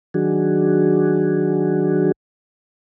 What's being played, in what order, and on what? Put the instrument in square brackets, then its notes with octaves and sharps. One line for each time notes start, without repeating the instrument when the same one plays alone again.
[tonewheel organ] D#3 F#3 D4 F#4 G#4